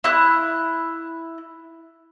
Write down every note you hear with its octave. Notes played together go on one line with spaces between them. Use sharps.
E4 F#6